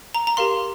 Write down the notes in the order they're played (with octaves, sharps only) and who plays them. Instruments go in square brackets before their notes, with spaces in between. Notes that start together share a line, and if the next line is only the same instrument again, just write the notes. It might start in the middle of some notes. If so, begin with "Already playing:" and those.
[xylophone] A#5
A#5
G4 A#4 F5 C6